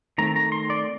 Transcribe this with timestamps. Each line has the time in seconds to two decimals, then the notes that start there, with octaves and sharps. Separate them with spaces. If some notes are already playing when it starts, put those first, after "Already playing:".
0.18 D#3 A3 C4 A#5
0.36 A#5
0.52 C6
0.70 D5